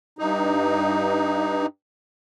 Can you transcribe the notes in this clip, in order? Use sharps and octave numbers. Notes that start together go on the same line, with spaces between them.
G2 D#4